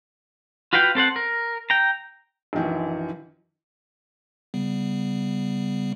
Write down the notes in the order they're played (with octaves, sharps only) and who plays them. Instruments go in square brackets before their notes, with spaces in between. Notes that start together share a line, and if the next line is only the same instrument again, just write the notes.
[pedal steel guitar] F4 F#4 B4 F5 G5
C4 A4 C5 F#5
A#4
G5 A#5
[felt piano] A#1 F#2 D#3 E3
[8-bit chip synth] C#3 G3 B3